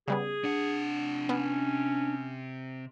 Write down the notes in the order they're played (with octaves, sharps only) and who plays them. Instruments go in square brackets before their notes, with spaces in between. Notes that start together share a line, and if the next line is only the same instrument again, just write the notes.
[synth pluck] C#3 G3 B3 [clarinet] G#4
[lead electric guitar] C3 F#5 [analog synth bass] D4
[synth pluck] B3 [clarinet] C#4